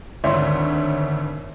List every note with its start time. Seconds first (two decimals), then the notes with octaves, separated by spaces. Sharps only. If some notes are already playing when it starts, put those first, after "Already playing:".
0.24 G#1 D2 D4 C#5 E5 C6